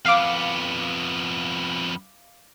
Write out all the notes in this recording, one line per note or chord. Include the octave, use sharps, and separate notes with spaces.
F2 B3 F5 D6